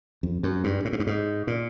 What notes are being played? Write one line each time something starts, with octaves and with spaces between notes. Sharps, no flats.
F2
F#2
G2
A2
G#2
G2
G#2
A#2